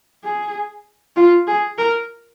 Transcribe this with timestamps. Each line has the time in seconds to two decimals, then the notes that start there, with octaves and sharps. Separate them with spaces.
0.24 G#4
1.16 F4
1.47 G#4
1.78 A#4